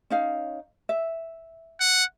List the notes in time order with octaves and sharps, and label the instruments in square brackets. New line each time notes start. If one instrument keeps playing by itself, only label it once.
[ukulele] C#4 D#4 F5
E5
[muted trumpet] F#5